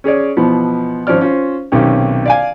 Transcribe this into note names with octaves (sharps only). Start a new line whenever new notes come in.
C#4 G#4 C#5 D5
B2 E3 F3 B3
G#1 F3 C#4 D5 F6
C#4 F4 C5
B1 C3 D#3 C#4 G4
D5 F5 G#5